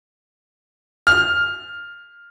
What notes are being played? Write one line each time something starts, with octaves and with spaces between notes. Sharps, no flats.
F6